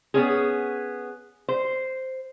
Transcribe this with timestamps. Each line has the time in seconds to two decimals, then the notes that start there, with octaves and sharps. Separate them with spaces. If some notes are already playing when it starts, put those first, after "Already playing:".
0.14 B3 C#4 G#4
1.48 C5